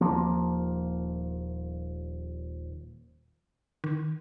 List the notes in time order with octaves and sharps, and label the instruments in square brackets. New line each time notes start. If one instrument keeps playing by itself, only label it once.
[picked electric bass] D#1 F3 A#3
[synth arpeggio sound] D#3